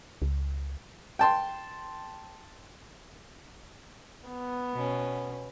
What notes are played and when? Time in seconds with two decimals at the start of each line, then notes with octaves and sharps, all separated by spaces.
0.22 C#2
1.19 G5 A5 C6
4.29 B3
4.73 B2 C#4